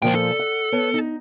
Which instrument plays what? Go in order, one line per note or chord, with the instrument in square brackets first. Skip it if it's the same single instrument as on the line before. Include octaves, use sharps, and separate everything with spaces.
[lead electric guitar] C#2 G5 [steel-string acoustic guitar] A#2 F3 C5
[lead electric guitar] A4
[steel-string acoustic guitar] F#5
B3 C#5 A5
D#4